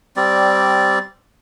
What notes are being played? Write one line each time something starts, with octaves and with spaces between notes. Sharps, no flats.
G3 C4 D5